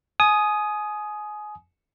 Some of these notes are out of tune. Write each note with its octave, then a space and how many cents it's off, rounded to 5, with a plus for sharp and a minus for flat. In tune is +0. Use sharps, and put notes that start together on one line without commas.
G#5 +25 D#6 +0